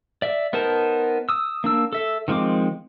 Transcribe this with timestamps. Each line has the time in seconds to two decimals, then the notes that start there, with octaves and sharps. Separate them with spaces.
0.22 D5 E5
0.53 B3 D#4 A#4 C5 A5
1.29 D#6 E6
1.64 A#3 D4 E6
1.93 A4 E5
2.28 D#3 F3 G#3 C4 D6